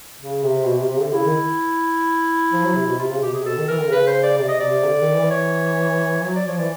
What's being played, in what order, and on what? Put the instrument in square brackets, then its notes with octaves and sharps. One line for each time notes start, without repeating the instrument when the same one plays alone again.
[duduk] C#3
C3
B2
C3
C3
D3
[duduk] C#3 [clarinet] E4
[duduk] D#3
F3
F#3
C3
B2
[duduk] C3 [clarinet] F4
[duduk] C#3
[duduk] B2 [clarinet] G4
[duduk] C3 [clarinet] G#4
[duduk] B2 [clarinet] A4
[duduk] D#3
[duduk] E3 [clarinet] A#4
[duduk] D3
[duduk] C#3 [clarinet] B4
[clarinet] C5
D5
[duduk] C3 [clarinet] D5
[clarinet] D#5
[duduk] C3 [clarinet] D5
[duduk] D3
D#3
E3
[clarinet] C#5
[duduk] F#3 [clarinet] C#5
[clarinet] D5
[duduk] F3 [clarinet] C#5
[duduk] E3 [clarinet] D5